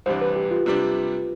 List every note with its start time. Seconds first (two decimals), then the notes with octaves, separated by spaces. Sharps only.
0.06 C2 C3 E3 G3 D4 C5
0.21 B4
0.36 G4
0.51 F4
0.66 C3 G3 D4